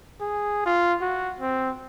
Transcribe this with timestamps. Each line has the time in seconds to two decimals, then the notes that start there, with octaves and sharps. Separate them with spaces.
0.21 G#4
0.66 F4
1.01 F#4
1.41 C4